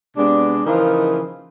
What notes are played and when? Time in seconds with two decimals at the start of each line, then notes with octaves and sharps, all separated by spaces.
0.17 C3 G#3 B3 D4
0.65 C#3 E3 F3 A#3 D#4 A#4